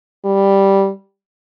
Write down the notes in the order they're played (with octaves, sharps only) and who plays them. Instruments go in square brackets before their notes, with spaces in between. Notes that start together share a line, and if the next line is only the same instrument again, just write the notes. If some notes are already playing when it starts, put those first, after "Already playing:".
[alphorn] G3